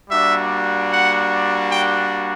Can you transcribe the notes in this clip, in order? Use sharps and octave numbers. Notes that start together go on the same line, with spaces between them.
G3 A#3 D4 F#4 E5
F#5
G5